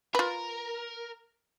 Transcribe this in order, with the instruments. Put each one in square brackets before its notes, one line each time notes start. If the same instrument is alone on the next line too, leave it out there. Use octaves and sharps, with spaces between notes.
[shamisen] F4 B4 [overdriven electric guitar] A#4